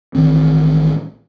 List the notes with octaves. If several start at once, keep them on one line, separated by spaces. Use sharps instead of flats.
A1 D#3 C4